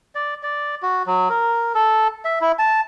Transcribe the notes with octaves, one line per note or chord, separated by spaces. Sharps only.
D5
D5
F#4
F#3
A#4
A4
E5
E4
A5